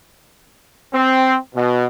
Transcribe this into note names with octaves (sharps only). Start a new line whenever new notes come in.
C4
B2